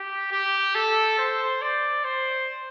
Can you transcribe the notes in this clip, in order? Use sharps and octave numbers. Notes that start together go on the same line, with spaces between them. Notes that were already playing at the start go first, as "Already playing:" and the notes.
Already playing: G4
G4
A4
C5
D5
C5